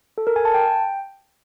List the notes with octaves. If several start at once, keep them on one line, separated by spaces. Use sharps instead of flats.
A4
A#4
G#5
A5
G5